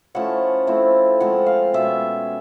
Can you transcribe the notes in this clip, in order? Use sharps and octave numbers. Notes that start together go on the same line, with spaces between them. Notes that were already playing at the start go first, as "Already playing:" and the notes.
F3 A3 C#4 E4 F#5
F3 A3 C4 E4
F3 G#3 C4 F#5
F5
B2 G#3 C#4 F4 E5